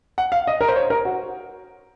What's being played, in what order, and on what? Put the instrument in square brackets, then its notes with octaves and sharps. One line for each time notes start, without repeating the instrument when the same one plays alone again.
[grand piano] F#5
F5
D#5
A#4
C5
C#5
A#4
F#4